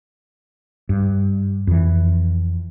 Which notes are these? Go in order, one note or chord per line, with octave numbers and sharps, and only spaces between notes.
G2
F2 E3